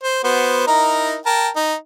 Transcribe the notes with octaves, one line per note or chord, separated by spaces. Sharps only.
C5
B3 F#4 C5
D#4 E4 A#4
A#4 G5 A5
D#4